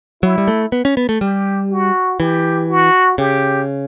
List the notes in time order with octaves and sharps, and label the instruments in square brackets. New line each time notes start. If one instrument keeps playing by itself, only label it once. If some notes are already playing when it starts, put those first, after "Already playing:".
[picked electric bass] F#3 [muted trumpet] E4
[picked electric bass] G3
A3
B3
C#4
B3
A3
[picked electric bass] G3 [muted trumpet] G4
[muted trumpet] F#4
[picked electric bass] E3 [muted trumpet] G4
[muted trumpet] F#4
[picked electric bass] C#3 [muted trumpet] G4